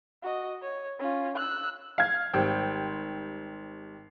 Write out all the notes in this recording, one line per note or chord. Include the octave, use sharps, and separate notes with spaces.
F#4 D#5
C#5
C#4 F4
E6 F#6
F5 G#6
G#1 G3 C5 G5